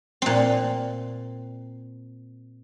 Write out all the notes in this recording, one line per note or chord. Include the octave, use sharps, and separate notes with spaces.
A#2 C4